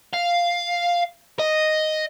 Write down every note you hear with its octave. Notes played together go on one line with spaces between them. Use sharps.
F5
D#5